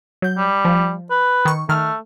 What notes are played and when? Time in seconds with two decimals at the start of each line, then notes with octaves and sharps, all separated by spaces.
0.22 F#3 G6
0.38 G3
0.65 F3
1.11 B4
1.45 D#3 C#6
1.69 D#3 A3 F6